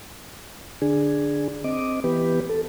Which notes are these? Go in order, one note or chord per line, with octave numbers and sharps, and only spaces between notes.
D3 D4 G#4
C4 D#5 D6
E3 B3 G4 B4
A4